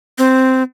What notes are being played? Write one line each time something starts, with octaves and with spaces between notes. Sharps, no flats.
C4